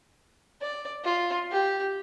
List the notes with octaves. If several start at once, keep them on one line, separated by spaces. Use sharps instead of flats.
D5
F4
G4